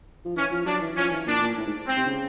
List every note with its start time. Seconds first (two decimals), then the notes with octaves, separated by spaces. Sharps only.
0.25 F3
0.37 E3 C#4
0.51 F3
0.66 F#3 D4
0.81 E3
0.96 F3 C#4
1.11 E3
1.27 A#2 D4
1.41 A#2
1.57 A2
1.67 G#2
1.87 C4
1.97 C3
2.06 C#3